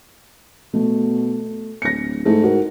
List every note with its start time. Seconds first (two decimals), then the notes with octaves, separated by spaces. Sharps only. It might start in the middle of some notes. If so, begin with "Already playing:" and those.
0.74 B2 A3
1.82 D1 A#6 C#7
2.25 G#2 A3 E4 G#4
2.42 D#4 F#4 A#4